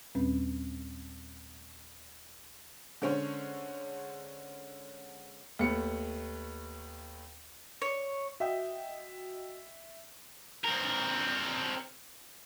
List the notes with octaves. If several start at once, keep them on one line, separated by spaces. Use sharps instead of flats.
D#2 A#2 G3 C4 C#4 B4
D3 G#3 C#4 C5 C#5
D#2 A3 B3 C#7
C#5
F#4 D#5 E5 G5
C4 A#4